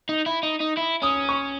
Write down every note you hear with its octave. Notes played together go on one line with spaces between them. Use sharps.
D#4
E4
D#4
D#4
E4
C#4 D#6
C#6